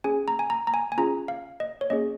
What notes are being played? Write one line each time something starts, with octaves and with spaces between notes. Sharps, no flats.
C#4 G#4 G#5
A#5
G#5
A#5
A#5
G#5
G#5
C#4 F4 G#4 A#5
F5
D#5
C#5
A#3 C#4 G#4 D#5